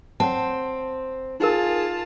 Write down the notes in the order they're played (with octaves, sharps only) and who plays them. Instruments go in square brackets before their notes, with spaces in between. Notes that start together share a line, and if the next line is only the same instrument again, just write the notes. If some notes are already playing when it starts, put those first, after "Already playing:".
[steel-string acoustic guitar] C4 [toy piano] C#5 F#5 A5
[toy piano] D#4 A#4 [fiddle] F4 A5 [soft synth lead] G#4